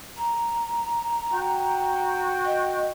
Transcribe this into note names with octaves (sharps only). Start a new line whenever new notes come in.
A#5
F#4 G5
D#5